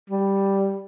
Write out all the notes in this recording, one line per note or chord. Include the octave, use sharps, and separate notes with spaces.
G3